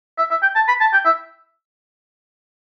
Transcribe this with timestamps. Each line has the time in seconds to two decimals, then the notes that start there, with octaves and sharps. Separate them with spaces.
0.18 E5
0.31 E5
0.43 G5
0.55 A5
0.68 B5
0.80 A5
0.93 G5
1.05 E5